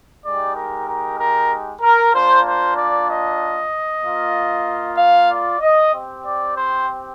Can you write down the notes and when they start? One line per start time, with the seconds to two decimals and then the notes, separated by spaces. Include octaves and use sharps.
0.23 G#3 D#4 G4 D5
0.55 A#4
0.86 A#4
1.18 A#4
1.81 A#4
2.13 A#3 D4 F4 C5
2.44 C5
2.76 D5
3.08 D#5
4.02 A#3 F4
4.97 F5
5.29 D5
5.60 D#5
5.92 C4 G4
6.24 D5
6.55 C5